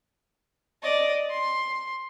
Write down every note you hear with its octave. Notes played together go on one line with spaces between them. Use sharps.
D5 D#5
C6